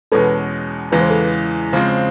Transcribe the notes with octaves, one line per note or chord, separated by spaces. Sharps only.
E2 B2 G#3 C#4 A4 B4
E2 C#3 E3 G#3 B4
C5
A4 B4
C#3 F3 G#3 C4 C5